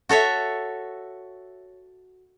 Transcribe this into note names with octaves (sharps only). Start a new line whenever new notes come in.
F#4 A4 C#5 E5